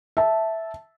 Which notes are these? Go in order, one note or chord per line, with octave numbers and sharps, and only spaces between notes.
E5 A5